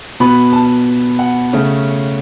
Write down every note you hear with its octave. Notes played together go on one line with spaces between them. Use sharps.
B2 B3 B5
A5
F#5
C#3 A3 C#4